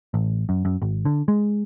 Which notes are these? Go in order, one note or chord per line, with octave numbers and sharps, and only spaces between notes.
A1
F#2
F#2
G#1
D3
G#3